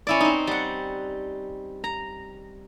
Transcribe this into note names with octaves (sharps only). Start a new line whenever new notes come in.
C#4 E4 D5
C4 D#4
G3 F#5
A#5